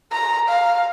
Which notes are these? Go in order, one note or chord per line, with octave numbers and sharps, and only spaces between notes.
A#5
F5